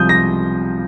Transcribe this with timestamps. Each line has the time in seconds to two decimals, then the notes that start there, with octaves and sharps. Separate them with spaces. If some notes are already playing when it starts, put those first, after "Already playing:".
Already playing: C2 C3 F3 D#6 G6
0.09 A#6